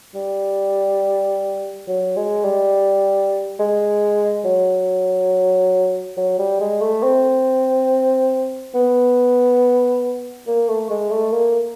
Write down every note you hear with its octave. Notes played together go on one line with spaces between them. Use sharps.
G3
F#3
G#3
G3
G#3
F#3
F#3
G3
G#3
A3
C4
B3
A#3
A3
G#3
A3
A#3